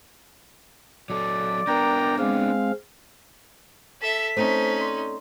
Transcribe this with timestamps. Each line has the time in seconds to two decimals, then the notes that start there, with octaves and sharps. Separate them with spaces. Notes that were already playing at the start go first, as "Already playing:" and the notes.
1.10 F#3 A4 D5
1.67 B3 D4 A#4 G5 A#5
2.19 G#3 C4 F5
4.01 A4 E5 B6
4.37 A3 C4 C#4 D#4 C5 A5
4.79 D5 C6